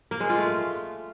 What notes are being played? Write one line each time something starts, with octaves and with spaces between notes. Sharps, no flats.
A#3
G#3
F4
A3